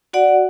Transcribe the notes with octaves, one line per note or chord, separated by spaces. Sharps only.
F#4 D5 F#5